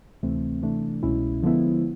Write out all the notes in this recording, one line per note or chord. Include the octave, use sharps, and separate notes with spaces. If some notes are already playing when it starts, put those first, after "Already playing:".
D2 C3 E3 A3 C4
C3 E3 A3 D4
C2 B2 G#3 C#4 E4
D3 F3 G#3 B3 E4